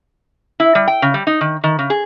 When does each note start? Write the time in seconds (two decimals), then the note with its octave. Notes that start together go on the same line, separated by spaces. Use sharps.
0.60 E4
0.75 G3
0.88 G5
1.02 C#3
1.14 G3
1.27 D#4
1.41 D#3
1.64 D#3
1.79 C#3
1.90 G#4